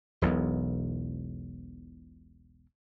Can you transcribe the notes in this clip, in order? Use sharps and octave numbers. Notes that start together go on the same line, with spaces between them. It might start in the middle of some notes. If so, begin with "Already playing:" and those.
E1 B1 E2